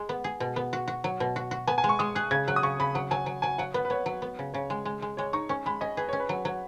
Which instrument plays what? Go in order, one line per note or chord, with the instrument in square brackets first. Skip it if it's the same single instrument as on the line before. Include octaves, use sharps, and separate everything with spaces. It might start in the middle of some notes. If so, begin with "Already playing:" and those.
Already playing: [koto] G#3
B3
G#4
B2
B3
F#4
F#4
F#3
B2
F#4
F#4
[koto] B3 [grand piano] G#5
[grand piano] G#5
[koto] G#3
[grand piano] C#6
[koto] G#3 [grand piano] D#6
[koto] G#4 [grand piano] F#6
[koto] C#3 [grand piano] G#6
[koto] F#3 [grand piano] F#6
[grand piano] D#6
[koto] C#3 [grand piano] C#6
[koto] C#3 [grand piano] B5
[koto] F#3 [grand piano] F#5
[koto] F#3 [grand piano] G#5
[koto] F#3
[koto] F#3 [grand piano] G#5
[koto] F#3 [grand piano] F#5
[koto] B3 [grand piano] B4
[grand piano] B4
[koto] B3 [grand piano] C#5
[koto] F#3
B3
C#3
[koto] C#3 [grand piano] C#5
[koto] G#3
G#3
G#3
[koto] G#3 [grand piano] C#5
[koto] D#4 [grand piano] C#6
[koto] C#4 [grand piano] C#6
[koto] G#3 [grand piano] B5
[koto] C#4 [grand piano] D#5
[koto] G#4 [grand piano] B4
[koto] C#4 [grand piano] C#5
[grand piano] B4
[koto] F#3
F#3